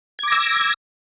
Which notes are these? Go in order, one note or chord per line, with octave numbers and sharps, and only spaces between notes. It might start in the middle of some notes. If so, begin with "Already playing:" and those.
D6 E6 G#6 A#6